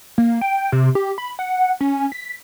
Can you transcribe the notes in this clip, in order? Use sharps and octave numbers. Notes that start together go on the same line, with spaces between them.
A#3
G5
C3
G4
B5
F#5
C#4
B6